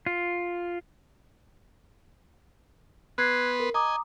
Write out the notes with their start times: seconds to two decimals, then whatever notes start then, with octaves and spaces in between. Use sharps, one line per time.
0.06 F4
3.18 B3 B4 C6 F#6 G#6 C7
3.60 A#4
3.74 D#5 G#5 A#5 D6 D#6